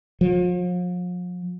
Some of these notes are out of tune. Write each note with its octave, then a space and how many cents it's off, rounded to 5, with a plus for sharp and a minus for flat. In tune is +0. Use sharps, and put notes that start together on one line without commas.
F3 +40